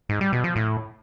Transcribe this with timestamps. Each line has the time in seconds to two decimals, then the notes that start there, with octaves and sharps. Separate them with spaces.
0.09 G#2
0.21 G3
0.33 B2
0.44 F3
0.56 A2